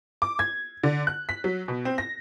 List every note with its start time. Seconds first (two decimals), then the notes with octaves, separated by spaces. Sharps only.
0.22 D6
0.39 G#6
0.83 D3
1.07 F#6
1.29 B6
1.44 F#3
1.68 B2
1.85 C4
1.98 A#6